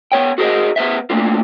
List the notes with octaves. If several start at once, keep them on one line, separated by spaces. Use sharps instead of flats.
B3 C#5 G5
F#4 G#4 A#4 C5 D#5
B3 B4 C5 E5
A3 A#3 C4 D4 F4